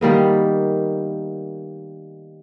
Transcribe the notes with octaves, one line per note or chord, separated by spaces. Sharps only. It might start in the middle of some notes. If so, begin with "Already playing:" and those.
D#3 G3 A#3 B3